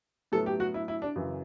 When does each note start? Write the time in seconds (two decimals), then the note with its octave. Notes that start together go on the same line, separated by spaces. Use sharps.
0.32 A2 F#3 B3 A4
0.46 G4
0.60 F#4
0.74 E4
0.88 E4
1.02 D4
1.16 F#2 C#3 E3